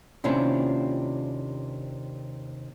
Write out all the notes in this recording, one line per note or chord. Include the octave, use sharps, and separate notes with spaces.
D#2 C3 C#4 D4 E4 F4